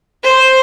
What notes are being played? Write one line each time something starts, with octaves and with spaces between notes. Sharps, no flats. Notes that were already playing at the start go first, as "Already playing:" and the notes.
C5